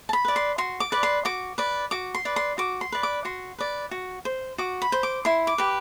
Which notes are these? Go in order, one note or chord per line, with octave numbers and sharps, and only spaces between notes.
A5
B5
B4 D5
C6
F#4 C6
D6
B4 D5
C6
F#4 D6
B4 D5
F#4 D6
C6
B4 D5
C6
F#4 D6
C6
B4 D5
D6
F#4 C6
B4 D5
F#4
C5
F#4 D6
B5
C5
D6
E4 C6
D6
G4 B4